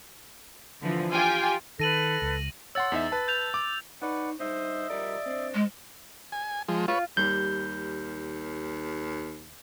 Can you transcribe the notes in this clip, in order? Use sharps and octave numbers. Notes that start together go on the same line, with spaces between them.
D3 E3 F3
F4 G4 G5 G#5
D#3 A4 B4 A#6 D#7 F#7
C#2
C#5 F#5 C6 E6 A6
E2 D#4 E5
B4 A5
G6 F7
D6
D#4 B4 C#5 D5 F#5
G2 D#4 C5 D#5 E5
F3 G3 A#4 D5
C4 D4
G#2 G#3
G#5
F3 G#3
F4 B4 C#5
D#2 G3 G6